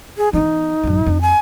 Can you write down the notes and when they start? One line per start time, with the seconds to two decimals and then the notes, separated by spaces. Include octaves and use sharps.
0.17 G#4
0.33 E3 B3 D#4
0.84 A1 F#2
1.06 F2
1.22 G#5